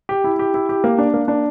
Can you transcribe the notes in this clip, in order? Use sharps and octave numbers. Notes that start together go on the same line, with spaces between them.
G4
E4
G4
E4
G4
A#3
D4
A#3
D4